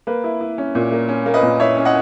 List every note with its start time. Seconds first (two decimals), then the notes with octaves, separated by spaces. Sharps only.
0.07 A#3 B4
0.24 E4
0.41 E4
0.58 C#4
0.75 A#2
0.92 A#3
1.09 C#4
1.26 A#3
1.34 B4 D#5
1.43 A#2
1.60 E4 C#5 E5
1.77 C#4
1.85 D#5 F#5